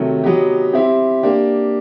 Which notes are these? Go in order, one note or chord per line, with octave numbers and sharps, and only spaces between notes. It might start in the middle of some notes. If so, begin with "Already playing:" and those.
Already playing: C3 D#3 F#3 A3
F#3 B3 D#4 G4
C4 E4 G4
A#3 D4 G4